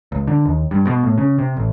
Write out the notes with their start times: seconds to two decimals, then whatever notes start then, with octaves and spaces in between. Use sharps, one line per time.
0.12 C#2
0.27 D3
0.46 D#2
0.71 G2
0.87 B2
1.03 A2
1.18 C#3
1.38 C3
1.57 A1